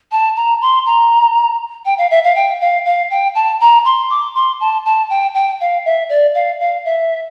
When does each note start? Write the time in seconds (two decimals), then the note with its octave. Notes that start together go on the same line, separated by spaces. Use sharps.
0.12 A5
0.36 A#5
0.62 C6
0.86 A#5
1.86 G5
1.98 F5
2.11 E5
2.24 F5
2.36 G5
2.61 F5
2.85 F5
3.11 G5
3.35 A5
3.61 A#5
3.85 C6
4.10 D6
4.35 C6
4.60 A5
4.85 A5
5.10 G5
5.34 G5
5.61 F5
5.85 E5
6.09 D5
6.34 F5
6.60 F5
6.85 E5